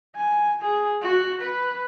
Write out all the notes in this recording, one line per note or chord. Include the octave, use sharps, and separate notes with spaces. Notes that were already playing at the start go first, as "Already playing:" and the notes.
G#5
G#4
F#4
B4